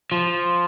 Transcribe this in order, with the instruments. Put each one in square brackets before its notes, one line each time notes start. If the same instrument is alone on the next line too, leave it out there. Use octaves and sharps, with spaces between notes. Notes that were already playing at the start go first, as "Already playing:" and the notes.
[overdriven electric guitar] F3